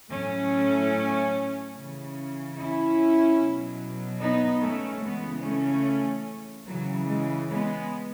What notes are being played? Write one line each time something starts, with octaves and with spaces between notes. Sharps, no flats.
A2 F#3 A3 C#4
C#3 E3
C#4 E4
B2 F#3
B3 D#4
A3 C#4
C#3 E3 G#3 B3
A3 C#4
C#3 E3 F#3
G#3
G#3 B3